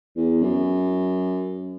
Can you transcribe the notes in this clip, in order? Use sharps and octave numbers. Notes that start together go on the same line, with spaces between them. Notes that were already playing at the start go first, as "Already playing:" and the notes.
E2
F#2